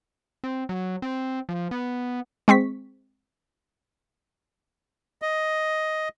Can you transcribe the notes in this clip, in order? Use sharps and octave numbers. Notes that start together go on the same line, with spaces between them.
C4
F#3
C4
F3
B3
G#3 C4 C#6 B6
D#5